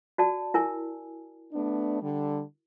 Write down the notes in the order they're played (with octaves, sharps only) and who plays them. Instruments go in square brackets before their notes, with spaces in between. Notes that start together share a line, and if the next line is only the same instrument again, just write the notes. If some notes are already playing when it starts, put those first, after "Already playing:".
[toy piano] F#4 D5 A5
E4 A#4 G#5
[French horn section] A3 B3 D4
D3 G3